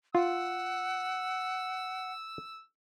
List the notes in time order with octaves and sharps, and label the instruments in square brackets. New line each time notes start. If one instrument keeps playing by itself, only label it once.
[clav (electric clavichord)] F4 [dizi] F#5 [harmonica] E6